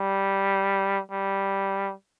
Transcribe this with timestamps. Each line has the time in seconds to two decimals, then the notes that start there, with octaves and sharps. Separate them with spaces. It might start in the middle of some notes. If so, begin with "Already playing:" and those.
Already playing: G3
1.12 G3